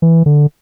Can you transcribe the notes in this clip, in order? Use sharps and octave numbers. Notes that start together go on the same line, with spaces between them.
E3
D3